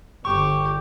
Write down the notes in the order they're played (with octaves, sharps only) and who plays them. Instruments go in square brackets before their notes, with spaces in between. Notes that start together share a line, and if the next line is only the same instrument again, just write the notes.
[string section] G1 [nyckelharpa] G4 [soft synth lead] C#6